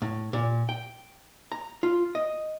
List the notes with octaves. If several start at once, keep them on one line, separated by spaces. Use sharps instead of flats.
A2
A#2
G5
A#5
F4
D#5